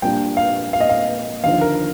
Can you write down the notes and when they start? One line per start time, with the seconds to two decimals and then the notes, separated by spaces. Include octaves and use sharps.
0.02 A#1 A#2 G3 A#3 D4 G5
0.37 F5
0.73 F5
0.80 D#5
0.89 F5
1.44 D#2 D3 F3 F5
1.61 A#4